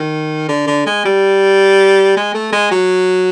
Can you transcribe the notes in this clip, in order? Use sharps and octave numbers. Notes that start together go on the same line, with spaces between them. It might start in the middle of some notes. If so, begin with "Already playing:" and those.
Already playing: D#3
D3
D3
G#3
G3
G#3
A3
G#3
F#3